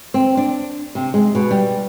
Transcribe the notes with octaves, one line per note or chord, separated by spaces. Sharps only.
C4
D4
C3
G#3
B2
G3